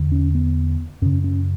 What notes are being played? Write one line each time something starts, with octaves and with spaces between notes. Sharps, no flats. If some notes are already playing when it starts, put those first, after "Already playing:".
Already playing: E2 D3
C#4
B3
F#2 C#3 C#4
C#4